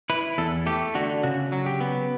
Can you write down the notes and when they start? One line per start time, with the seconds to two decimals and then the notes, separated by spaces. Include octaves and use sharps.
0.10 E4 B4
0.38 E2 A4
0.66 A3 G4
0.95 D3 F#4
1.24 C#3 F#4
1.52 F#3
1.66 G4
1.81 B3